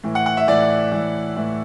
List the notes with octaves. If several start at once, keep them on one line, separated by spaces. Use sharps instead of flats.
A2 E3
F#5
F#5
E5
A2 E3 D5
A2 E3
A2 E3